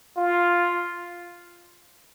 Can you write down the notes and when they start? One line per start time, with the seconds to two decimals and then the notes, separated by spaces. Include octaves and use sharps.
0.17 F4